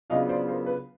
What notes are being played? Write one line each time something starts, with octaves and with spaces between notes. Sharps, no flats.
C#3 F#3 B3 D4 F4 D#5 F5
C5 D5
A#4 C5
B4